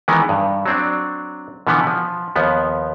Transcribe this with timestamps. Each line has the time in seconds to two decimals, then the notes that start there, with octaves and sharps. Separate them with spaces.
0.08 D#3 E3 G#3 B3
0.29 G2
0.66 F#3 C4 D4
1.67 B2 D3 E3 F3 B3
1.87 F3
2.36 D#2 F3 B3